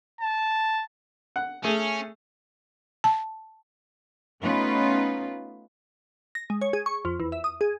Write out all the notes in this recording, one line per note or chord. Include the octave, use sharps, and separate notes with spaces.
A5
F#5
A3 C#4 G#4
A5
A3 B3 C#4 D#4 F4 B4
A#6
G#3
C#5
G#4
C#6
F2
E2
E5
D#6
G#4